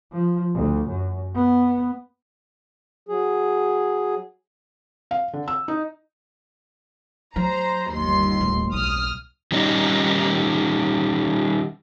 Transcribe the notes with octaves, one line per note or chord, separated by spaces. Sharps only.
F3
D2
F#2
B3
F#3 G#4
F5
D3
E6
D#4
F#3 C5 A#5
G1 D#2 C6
D1
B1 D#6 F6
D#3 G3 C#4 D#4